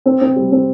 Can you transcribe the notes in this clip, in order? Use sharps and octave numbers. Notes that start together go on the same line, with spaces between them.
C4
C4
G3
C4